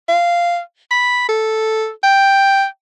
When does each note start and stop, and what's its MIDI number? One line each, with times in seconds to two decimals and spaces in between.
0.08 0.59 77
0.91 1.28 83
1.29 1.89 69
2.03 2.65 79